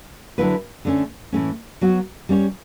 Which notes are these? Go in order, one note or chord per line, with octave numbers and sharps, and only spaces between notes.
D3 F#3 A3 E4 B4
D3 A3 C#4
A2 E3 A3 C#4
F#3 B3 F#4
G3 C#4 F#4 C#5